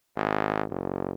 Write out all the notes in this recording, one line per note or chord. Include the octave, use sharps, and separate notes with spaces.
G#1
F#1